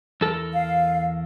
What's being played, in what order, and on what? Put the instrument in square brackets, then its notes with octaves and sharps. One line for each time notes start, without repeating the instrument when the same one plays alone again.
[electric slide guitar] E2 A4 A#4
[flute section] F5